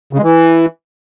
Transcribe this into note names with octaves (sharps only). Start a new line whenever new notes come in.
C#3
G#3
E3